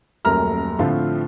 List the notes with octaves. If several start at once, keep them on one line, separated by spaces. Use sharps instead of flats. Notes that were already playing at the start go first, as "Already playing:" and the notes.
D#1 F#2 A3 A#4 A#5 F6
A2 D3 F3 A3 C4 F4